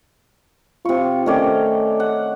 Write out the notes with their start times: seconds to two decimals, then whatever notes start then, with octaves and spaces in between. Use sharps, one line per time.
0.85 C3 F4 C#6
1.26 D#3 A3 C#4 D5
2.00 F#5